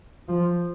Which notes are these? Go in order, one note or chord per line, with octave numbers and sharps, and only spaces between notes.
F3